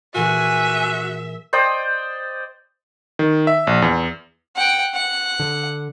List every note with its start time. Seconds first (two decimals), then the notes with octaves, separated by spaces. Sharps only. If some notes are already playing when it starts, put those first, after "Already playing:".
0.15 A#2 E3 F#4 G#4 E5 G#5
1.53 C5 D5 D#5 G5
3.19 D#3
3.47 E5
3.67 A#1
3.82 E2
4.56 F#5 G5
4.94 F#5
5.40 D3